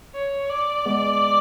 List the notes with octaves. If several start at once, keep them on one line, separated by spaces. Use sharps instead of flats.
C#5
D5
G#3 B3